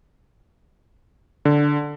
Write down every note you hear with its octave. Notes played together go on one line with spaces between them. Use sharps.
D3